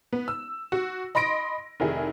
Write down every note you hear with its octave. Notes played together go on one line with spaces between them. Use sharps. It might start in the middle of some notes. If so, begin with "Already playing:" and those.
B3
E6
F#4
D#5 B5 C6 A#6 D7
F1 D#3 E4 G#4